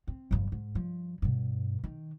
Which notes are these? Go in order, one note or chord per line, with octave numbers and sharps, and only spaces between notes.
C4
G1 F2
G#2
G2 F3
G2 B2
D#3